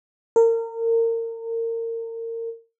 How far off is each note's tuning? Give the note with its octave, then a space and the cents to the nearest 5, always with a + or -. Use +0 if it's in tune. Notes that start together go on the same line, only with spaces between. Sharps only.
A#4 -30